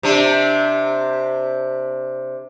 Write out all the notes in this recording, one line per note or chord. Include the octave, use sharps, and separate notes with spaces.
C3 D4